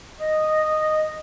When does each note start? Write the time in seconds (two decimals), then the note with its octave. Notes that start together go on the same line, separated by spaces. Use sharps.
0.20 D#5